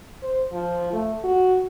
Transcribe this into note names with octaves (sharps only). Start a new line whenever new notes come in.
C5
F3
A3
F#4